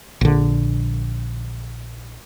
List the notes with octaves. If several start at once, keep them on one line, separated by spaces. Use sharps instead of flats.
A#1 D3